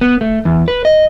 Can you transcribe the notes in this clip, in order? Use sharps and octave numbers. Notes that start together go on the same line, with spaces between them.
B3
A3
E2
B4
D#5